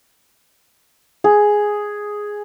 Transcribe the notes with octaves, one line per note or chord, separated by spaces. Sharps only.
G#4